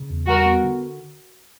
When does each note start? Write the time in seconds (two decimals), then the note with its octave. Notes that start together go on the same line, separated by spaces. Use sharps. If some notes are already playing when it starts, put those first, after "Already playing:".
Already playing: C#3
0.10 E2
0.27 G3 F#4 A#4
0.46 B3
0.64 D3